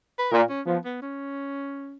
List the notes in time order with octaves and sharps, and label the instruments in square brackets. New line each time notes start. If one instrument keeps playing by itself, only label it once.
[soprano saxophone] B4
[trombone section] A#2 [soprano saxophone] A#4
[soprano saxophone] C#4
[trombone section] F3 [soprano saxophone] B3
[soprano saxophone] B3
C#4